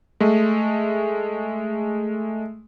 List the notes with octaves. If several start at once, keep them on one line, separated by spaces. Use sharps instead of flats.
G#3 A3